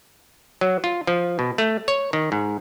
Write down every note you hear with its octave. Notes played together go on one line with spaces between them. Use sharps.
F#3
F4
F3
B2
A3
C#5
D#3
G#2